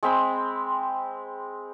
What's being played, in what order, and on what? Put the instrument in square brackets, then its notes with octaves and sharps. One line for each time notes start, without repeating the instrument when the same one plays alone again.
[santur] G#3 C4 B5